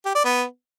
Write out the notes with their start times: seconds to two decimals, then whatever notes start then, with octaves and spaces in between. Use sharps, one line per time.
0.05 G4
0.15 D5
0.25 B3